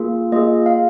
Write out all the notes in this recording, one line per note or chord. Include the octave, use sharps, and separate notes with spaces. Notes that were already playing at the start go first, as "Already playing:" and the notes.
Already playing: A#3 F4 G#4
A#3 F4 G#4 D#5
F5